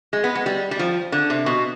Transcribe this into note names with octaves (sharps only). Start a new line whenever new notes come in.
G#3
B3
G#3
G3
G3
F3
D3
C3
B2